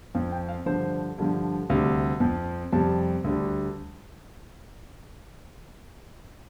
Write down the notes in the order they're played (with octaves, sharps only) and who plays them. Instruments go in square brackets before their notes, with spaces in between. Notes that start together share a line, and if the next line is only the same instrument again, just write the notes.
[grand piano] F2 F3 F5
G5
F5
G2 D3 F3 C5
G2 D3 F3
D2 C3 G3 F5
F2 F3
F2 C3 G3 A5
D2 D3 G3